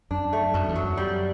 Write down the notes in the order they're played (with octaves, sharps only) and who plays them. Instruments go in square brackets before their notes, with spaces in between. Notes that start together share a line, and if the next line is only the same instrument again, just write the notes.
[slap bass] F#2 [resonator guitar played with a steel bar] D4
[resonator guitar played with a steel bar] A3
[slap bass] F#2 [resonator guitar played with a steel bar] B2
[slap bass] E2
[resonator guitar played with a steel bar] F#3
[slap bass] F#2
[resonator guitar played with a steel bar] G3